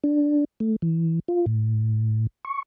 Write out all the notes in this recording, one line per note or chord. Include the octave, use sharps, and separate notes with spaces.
D4
A3
E3
F4
A2
C#6